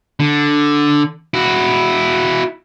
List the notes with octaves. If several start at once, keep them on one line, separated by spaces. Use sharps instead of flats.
D3
E4 F#4